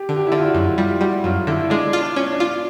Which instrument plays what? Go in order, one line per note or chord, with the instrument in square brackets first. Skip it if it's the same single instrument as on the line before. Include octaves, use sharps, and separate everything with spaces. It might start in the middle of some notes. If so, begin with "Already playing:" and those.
Already playing: [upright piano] G4
[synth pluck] D3
[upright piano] G4
E4
[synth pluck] D3
[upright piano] F4
F#4
[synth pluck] F#2
[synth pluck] G3 [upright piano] F4
[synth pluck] G3 [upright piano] F#4
[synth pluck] F#2 [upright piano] F4
[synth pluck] D3 [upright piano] E4
[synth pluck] G#3 [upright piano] D4
[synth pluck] F4
[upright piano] D4
[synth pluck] C#4
[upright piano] D4
[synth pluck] F4